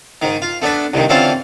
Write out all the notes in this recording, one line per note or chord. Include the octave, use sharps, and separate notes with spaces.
G#2 D#3
F4
A3 B3 D4 B4
C2 G2 D#3
D3 E3 C4 C#4 F4 A5